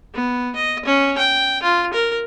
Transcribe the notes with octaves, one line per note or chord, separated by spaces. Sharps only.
B3
D#5
C#4
G5
F4
A#4